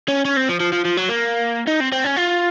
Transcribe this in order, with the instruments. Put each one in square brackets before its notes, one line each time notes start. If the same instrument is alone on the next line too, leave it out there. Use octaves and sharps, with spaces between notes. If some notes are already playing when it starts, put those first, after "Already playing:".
[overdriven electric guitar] C#4
C#4
C4
F3
F3
F3
F3
F#3
A#3
D#4
C4
C4
C#4
F4